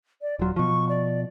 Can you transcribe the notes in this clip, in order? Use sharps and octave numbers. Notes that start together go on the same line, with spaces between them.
D5
D#1 F#3 F4
B2 F3 C#6
D5